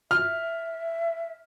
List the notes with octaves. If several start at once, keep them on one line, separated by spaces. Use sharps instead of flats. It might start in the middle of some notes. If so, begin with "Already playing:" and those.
E5 F6